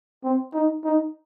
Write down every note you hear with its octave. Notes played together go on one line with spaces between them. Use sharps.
C4
D#4
D#4